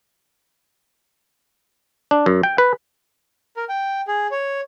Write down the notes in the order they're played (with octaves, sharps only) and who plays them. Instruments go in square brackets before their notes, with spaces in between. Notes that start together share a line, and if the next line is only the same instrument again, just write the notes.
[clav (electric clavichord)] D4
F#2
G5
B4
[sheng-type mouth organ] A#4
G5
G#4
C#5